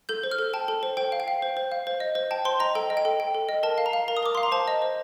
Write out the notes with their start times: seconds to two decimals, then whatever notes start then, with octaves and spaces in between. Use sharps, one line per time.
0.09 A4 G6
0.23 C5
0.31 F6
0.38 A4
0.53 G5 A5
0.68 A4
0.83 C5
0.97 C5 G5
1.12 F5
1.20 G5
1.28 F5
1.42 C5
1.57 C5
1.72 F5
1.87 C5
2.00 D#5
2.15 C5
2.31 G5 A5
2.45 C5 C6
2.60 D#5 A#5
2.75 A4 G5
2.90 D#5
2.97 G5
3.05 A4
3.20 G5
3.35 A4
3.49 D#5
3.63 A#4 A5
3.78 F5
3.86 A#5
3.93 F5
4.08 A#4 A#5
4.17 D#6
4.23 A#4 D6
4.35 F5 C6
4.43 A#5
4.52 C5 A5
4.68 D#5
4.82 C5